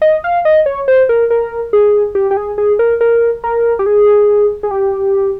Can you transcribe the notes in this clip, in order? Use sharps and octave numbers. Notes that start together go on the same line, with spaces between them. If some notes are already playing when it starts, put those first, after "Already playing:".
D#5
F5
D#5
C#5
C5
A#4
A#4
G#4
G4
G4
G#4
G#4
A#4
A#4
A#4
G4
G#4
G#4
G4